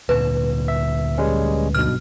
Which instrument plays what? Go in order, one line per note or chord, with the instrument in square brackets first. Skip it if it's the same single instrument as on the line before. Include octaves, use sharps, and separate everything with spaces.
[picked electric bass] D2 A#2 D3 [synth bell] B4
[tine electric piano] E5
G3 G#3 C#4
[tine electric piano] B1 G2 B2 [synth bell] F6